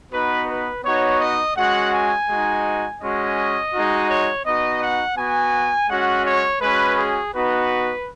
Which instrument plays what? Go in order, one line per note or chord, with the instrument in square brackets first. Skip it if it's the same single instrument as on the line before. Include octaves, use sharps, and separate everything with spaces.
[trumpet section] B3 D#4 F#4 B4
B4
B3 D#4 F#4 C#5
D#5
G#3 C#4 F#4 F#5
G#5
G#3 D#4 F#4
G#3 C#4 F#4 D#5
G#3 D#4 F#4
C#5
B3 D#4 F#4 D#5
F#5
B3 F#4 G#5
G#3 C#4 F#4 F#5
C#5
G#3 C#4 F#4 B4
G#4
B3 D#4 F#4 B4